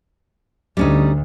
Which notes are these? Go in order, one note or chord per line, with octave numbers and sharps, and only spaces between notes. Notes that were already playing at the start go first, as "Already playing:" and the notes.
D2 G3 C#4 D#4